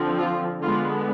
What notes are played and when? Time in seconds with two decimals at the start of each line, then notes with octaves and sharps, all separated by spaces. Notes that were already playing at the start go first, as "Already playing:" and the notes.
Already playing: D3 F3 C4
0.18 F4
0.61 D3 G#3 B3 F4